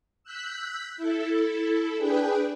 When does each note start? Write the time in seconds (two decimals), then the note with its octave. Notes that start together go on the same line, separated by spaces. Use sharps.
0.24 E6 F#6 G6 B6
0.96 E4 A4
1.98 D4 G#4 B4 G5